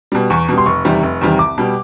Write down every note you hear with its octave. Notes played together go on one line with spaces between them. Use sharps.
B2 G3
E2 C#6
B2 G3
C6
F1 C#6
E2 C3 D#3 G3
F1
E2 C3 D#3 G3
C2 D6
B2 G3